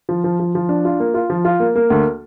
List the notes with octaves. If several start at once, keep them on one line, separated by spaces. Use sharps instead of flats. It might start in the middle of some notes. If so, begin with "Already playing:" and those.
F3
F3
F3
F3
D4
F4
A#3
F4
F3
F4
A#3
A#3
D2